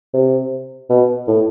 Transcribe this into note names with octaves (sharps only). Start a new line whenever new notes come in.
C3
B2
A2